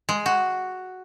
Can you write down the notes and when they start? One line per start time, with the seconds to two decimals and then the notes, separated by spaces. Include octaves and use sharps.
0.09 G#3
0.26 F#4